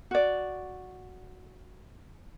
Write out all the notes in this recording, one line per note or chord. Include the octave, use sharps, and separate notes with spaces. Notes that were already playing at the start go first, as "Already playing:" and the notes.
F#4 D5